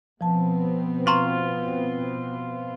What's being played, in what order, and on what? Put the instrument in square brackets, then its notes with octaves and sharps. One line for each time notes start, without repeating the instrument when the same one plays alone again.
[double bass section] B2 B3 C4 [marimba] F3 A5
[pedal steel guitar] F4 [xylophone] A#5 C6 C#6